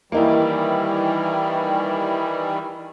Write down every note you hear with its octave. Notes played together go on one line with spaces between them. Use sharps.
D#3 E3 G3 A#3 D#4 E4